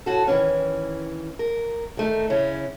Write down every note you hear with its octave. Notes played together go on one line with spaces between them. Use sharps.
A2 F#4 A4
D#3 E3 C#4
A#4
D#3 A3 D#4
C#3 C#4 E4